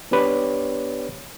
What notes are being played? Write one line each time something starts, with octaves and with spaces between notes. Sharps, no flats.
B3 D4 G4 B4 C#5 D5